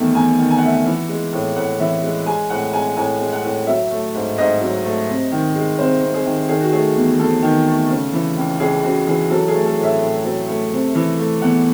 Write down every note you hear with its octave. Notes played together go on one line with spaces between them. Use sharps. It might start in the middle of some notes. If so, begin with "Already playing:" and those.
Already playing: E2 D#3 A3
E2 G#5
D#3
G#5
F#5
A3 E5
F#5
E3
G#3
A2
A2 F#5
E3 E5
G#3
G#3 G#5
A2 F#5
G#3 G#5
A2 G#5
G#3
F#5
A2
F#3 E5
A3
G#2
G#2 D#5
F#3
A3
C3
D#3
G#3
C2 C5
C3
G#4
D#3
D#3 G#4
F#4
A3 G#4
E2
E2 A4
D#3
A3
C#3
E3
C#2
C#2 G#4
C#3 F#4
E3 G#4
F#3 A4
G#4
A3
A4
A2
E5
A2
F#3
A3
C3
E3
A3
E2 F#5